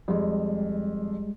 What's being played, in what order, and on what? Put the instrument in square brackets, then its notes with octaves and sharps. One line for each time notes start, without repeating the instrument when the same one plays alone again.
[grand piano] F2 [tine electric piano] G3 G#3